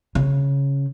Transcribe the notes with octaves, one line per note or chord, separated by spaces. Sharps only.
C#3